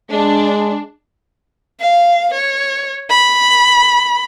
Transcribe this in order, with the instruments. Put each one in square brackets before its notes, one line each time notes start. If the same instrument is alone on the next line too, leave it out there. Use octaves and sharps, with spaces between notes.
[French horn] G#3 [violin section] D4
[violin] F5
C#5
B5